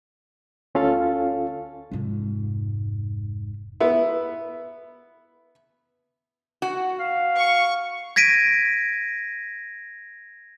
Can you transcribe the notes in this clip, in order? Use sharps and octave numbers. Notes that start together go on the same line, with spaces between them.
D2 C#4 F4 A4 F5
F1 G#2
B3 E4
F#4
F5
C#6
G#6 A#6 B6 D7 D#7